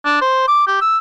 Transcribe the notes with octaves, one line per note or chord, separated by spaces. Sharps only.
D4
C5
D6
G4
E6